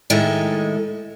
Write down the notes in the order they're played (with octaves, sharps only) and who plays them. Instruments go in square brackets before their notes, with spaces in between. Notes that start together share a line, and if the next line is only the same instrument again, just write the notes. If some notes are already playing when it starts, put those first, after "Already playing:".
[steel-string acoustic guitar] A2 D#3 G#3 A4 E5